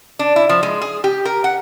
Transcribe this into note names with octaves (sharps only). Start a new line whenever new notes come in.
D4
E4
F3
G#3
G#4
G4
A#4
F#5